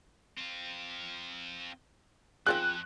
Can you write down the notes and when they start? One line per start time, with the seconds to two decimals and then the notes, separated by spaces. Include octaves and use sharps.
0.38 C4 F4
2.47 F2 C4 F4 G#4 F#6